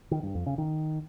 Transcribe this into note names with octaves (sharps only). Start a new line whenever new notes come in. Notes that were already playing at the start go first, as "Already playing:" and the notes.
D#3
G2
F2
C#3
D#3